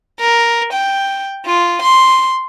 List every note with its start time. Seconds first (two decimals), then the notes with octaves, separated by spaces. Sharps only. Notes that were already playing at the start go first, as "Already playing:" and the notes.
0.20 A#4
0.73 G5
1.46 F4
1.82 C6